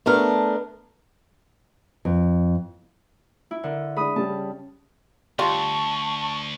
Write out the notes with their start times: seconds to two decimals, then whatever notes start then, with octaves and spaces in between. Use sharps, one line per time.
0.06 A3 B3 D4 A#4
2.05 F2
3.51 E4
3.64 D3 A#4
3.96 G#3 D4 B5 D#6
4.16 C#3 G3 C#4 A5
5.39 D2 G3 F4 A5 C#6